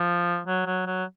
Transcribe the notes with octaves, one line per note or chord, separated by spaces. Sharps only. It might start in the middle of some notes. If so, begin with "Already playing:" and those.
Already playing: F3
F#3
F#3
F#3